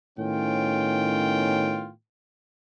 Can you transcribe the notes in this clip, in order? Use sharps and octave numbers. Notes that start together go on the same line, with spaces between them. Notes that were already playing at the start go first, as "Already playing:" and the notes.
A2 D#3 B3 C#4 F4 G5